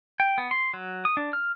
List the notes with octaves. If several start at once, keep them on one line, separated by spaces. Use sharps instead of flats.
G5
B3
C6
F#3
D#6
D4
F6